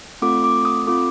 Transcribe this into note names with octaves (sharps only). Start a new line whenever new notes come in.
A3 C4 F4 A4 D6
D6
D#6
C4 F4 A4 D6